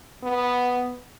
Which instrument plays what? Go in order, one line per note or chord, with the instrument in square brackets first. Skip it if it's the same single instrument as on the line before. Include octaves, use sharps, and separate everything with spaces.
[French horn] B3